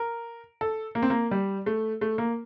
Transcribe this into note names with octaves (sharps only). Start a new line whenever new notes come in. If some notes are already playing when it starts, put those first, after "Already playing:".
Already playing: A#4
A4
A#3
C4
A#3
G3
A3
A3
A#3